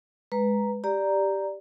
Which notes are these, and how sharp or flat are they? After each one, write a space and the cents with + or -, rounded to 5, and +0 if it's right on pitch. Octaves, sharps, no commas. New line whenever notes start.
G#3 +0 B4 +0 A#5 +0
G4 +0 D5 +0 A#5 +0